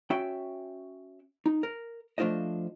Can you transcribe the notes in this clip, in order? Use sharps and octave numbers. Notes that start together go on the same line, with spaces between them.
C#4 F#4 E5 G5
D#4
A#4
F3 A3 D4 F4 C5 D#5